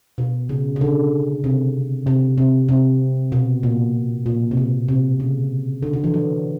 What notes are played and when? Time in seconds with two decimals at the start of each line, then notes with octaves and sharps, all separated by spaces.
0.18 B2
0.49 C#3
0.76 C#3
0.81 D3
1.44 C3
2.07 C3
2.38 C3
2.69 C3
3.32 B2
3.63 A#2
4.26 A#2
4.51 C3
4.57 B2
4.88 C3
5.20 C#3
5.83 D3
5.93 D3
6.04 E3
6.14 F#3